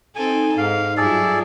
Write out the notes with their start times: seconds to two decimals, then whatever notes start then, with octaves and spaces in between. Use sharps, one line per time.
0.16 C4 D#4 A4 G#5
0.58 G#2 F5
0.97 G2 F#3 E4 F4 G#4 A4 D5